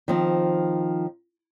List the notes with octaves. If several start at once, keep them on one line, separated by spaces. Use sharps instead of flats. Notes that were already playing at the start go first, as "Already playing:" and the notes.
D#3 F3 C4